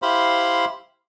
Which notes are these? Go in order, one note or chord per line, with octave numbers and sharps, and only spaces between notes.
E4 G4 C5 F5 B5 C6